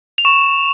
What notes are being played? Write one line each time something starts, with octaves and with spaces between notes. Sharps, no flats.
F7
C#6 E7